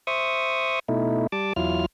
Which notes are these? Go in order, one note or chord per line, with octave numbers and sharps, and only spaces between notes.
C5 E5 C#6 D#6
B2 A3 D#4 E4
G3 A5 D6
E2 F#3 E4 F4 F6